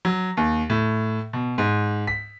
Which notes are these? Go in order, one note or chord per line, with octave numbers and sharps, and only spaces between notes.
F#3
D#2
A2
B2
G#2
B6